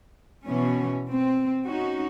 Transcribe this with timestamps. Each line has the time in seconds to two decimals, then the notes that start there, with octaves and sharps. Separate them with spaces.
0.46 B2 E3 C#4
1.11 C4
1.66 C#4 D#4 F#4